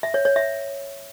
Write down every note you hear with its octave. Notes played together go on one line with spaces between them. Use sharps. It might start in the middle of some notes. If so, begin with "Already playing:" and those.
E5
C#5
C#5
E5